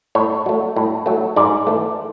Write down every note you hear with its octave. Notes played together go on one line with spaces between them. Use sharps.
A2 C#5
F#3 A3
A2
F#3 A3
G#2 D5
E3 A3